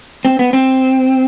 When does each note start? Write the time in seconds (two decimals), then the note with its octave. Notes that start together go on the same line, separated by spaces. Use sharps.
0.25 C4
0.39 B3
0.53 C4